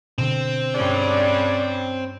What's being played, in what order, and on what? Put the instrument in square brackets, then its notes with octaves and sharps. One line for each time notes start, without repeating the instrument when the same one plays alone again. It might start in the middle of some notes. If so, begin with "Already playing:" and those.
[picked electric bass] B2 D3 [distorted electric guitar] C4
[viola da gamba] G2 G3 C#4 [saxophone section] G#3 D4 D5